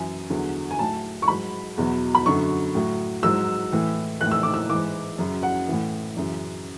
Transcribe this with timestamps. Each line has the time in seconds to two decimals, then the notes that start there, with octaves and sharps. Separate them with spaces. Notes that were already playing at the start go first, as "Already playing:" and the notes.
Already playing: F#2 E3 G#5
0.30 E2 D3 F#3
0.71 G#5
0.79 A2 F#3 A5
1.22 C#6
1.28 G#2 F#3 B5
1.78 E2 B2 F#3
2.15 B5
2.26 F#2 D3 F#3 C#6
2.75 A2 F#3
3.23 G#2 F#3 E6
3.72 A2 E3
4.21 E3 F#6
4.26 A2
4.31 E6
4.43 D6
4.54 E6
4.69 E3 D6
4.75 G#2
5.19 F#2 C#3 F#3
5.43 F#5
5.68 A2 E3
6.17 F#2 C#3 E3